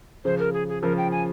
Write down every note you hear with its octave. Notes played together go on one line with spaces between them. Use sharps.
C#3 F3 C5
A#4
G#4
G#4
C#3 F3 A#4
G5
G#5